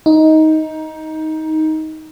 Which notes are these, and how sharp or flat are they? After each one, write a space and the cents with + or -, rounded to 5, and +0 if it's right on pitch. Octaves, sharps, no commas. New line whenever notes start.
D#4 +15